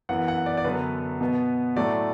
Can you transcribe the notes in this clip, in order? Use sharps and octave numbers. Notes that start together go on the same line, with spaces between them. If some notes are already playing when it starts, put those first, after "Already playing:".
F#2 E3 B3 F#5
F#5
D5
D5
F#2 D3 F#3 B3 B4
B2 B3
A2 F#3 A3 D5